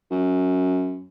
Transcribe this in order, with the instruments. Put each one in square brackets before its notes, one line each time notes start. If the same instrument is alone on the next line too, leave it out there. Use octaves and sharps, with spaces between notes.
[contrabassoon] F#2